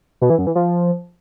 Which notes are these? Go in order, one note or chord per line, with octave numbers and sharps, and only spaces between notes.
B2
E3
F#2
E3
F3